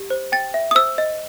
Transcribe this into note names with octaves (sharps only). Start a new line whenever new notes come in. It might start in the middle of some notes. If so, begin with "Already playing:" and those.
Already playing: G4
C5
G5 A6
E5
D#6
C5 E6
D#5